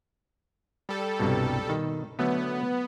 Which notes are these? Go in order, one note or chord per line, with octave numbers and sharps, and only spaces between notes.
G3 A4
C2 G2 B2
B2 D#3
D3 F#3 A3 B3